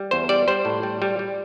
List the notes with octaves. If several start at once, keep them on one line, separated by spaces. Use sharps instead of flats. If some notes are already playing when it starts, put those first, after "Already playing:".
Already playing: G3
E2 C5
G3 D5
G3 C5
A2
G3
G3
G3